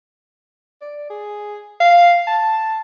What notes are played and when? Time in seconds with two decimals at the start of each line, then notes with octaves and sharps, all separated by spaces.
0.81 D5
1.10 G#4
1.80 F5
2.27 A5